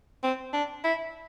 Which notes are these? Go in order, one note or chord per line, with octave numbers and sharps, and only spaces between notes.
C4
D4
E4